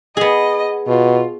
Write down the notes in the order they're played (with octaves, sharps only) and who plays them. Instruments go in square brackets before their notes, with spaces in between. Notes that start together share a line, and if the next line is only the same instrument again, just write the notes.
[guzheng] B3 G#4 [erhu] D#5
[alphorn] B2 [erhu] F4